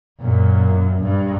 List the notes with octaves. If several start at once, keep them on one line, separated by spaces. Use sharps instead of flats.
F#2 A#2
G2